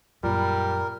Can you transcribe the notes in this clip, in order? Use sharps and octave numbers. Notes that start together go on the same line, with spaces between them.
F#2 A#2 G3 F4 A#4 D5 B5